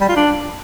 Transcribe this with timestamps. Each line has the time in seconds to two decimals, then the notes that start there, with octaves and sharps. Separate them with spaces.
0.01 G3
0.08 F4
0.16 D4